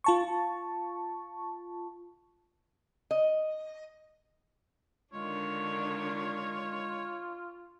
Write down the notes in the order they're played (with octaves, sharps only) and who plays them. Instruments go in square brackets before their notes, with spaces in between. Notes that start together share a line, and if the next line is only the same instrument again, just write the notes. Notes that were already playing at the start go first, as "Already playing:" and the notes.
[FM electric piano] F4 A5 C#6
[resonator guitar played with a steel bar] D#5
[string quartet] D3 D#3 D4 [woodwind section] G#3 [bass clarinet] F4 [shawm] C#5